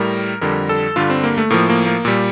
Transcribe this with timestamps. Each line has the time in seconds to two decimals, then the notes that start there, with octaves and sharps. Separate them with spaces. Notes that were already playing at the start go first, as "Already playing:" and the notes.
Already playing: A2 G3 A#4
0.41 F2 D3 G3 A#4
0.69 A4
0.96 G2 D3 G3 F4
1.10 C4
1.24 A#3
1.38 A3
1.50 A2 F3 A#3
1.69 A#3
1.86 A#3
2.05 A#2 G3